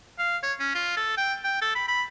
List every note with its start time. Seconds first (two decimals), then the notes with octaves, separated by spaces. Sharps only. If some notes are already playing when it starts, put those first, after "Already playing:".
0.18 F5
0.43 C#5
0.60 C#4
0.74 F4
0.97 A4
1.17 G5
1.44 G5
1.62 A4
1.75 B5
1.88 B5